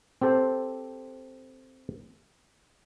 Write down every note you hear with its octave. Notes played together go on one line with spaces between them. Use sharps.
C4 G4 A4 C5